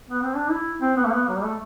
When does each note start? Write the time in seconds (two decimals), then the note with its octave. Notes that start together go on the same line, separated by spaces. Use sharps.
0.10 B3
0.23 C4
0.36 D4
0.51 E4
0.81 C4
0.97 B3
1.06 A3
1.12 B3
1.29 F#3
1.36 G3
1.44 A3